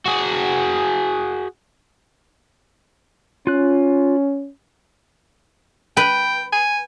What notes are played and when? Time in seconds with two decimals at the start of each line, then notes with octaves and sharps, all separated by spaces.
0.06 F#4 G#4
3.47 C#4 F4 F#6
5.97 B4 G5
6.52 G#5